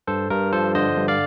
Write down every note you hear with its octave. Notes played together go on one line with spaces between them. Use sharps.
G2 A4 C5
G2 A#4
F3 A4 C5
D3 C5 D#5
G2
D5 F5